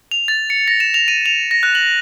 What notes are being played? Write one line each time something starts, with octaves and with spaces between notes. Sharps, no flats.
F7
A6
C#7
A#6
E7
F7
D#7
F7
A#6
F#6
F#7